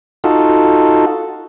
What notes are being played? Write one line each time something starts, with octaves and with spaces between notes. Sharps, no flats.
D#4 F4 F#4 A4